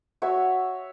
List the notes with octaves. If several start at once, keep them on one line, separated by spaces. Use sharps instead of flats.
F#4 C#5 E5